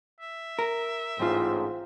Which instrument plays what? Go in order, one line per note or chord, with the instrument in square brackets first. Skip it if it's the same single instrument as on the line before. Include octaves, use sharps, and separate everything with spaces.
[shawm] E5
[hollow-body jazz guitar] A#4
[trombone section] A1 G#2 [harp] C4 F4